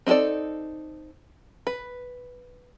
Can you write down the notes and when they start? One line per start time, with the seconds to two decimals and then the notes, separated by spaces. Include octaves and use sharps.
0.06 C4 D#4 F#4 A4 D5
1.67 B4